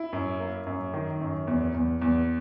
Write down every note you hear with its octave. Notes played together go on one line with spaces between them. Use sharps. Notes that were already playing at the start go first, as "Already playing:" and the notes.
Already playing: E4
F#2
A#3
F#2
D#3
F#2
E2
E2
E2